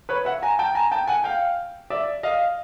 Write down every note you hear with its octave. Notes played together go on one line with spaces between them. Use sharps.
B4 C#5
E5 F#5
G#5 A#5
G5 A5
G#5 A#5
G5 A5
F#5 G#5
F5 G5
D5 E5
D#5 F5